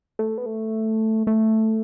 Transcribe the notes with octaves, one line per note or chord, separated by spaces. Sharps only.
A3
B3
A3
A3